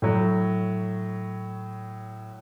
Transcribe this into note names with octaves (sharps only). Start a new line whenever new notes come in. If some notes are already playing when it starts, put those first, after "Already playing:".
A2 F#3